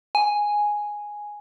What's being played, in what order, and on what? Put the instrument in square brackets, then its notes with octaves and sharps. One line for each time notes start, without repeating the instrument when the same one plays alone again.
[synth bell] G#5